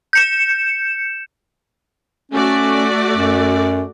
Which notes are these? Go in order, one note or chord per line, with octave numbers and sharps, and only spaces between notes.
G6 C#7 E7
A3 C#4 F#4 D5
F#2